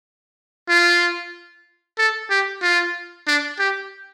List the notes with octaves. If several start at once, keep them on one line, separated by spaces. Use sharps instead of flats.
F4
A4
G4
F4
D4
G4